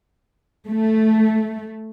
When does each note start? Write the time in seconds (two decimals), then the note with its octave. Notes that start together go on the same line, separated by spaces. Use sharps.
0.69 A3